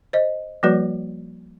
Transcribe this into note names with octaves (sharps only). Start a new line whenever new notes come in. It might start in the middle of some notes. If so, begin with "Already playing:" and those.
C5 D#5
F3 G3 A#3 F#4 B4 D5